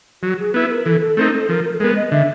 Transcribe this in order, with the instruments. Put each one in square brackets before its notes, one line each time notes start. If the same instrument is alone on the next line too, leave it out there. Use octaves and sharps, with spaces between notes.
[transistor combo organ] F#3 [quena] F#4
[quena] G#4
[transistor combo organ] B3 E4 [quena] B4
[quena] A#4
[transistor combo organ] E3 [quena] A4
[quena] A4
[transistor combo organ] A3 C4 D#4 [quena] A#4
[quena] A4
[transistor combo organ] F3 [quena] A#4
[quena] A#4
A4
[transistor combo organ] G#3 B3 [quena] A#4
[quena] D#5
[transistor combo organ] D3 [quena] E5